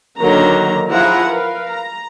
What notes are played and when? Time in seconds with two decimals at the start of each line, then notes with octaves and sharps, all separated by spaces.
0.18 D3 D#3 F#3 A#3 A#5
0.89 F3 E4 F4 G#4 F#5 A#5
1.28 A#4 B4 F5
1.68 A#5